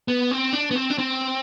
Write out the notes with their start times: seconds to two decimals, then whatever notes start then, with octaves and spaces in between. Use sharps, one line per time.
0.08 B3
0.31 C4
0.53 D4
0.71 B3
0.75 C4
0.90 D4
0.98 C4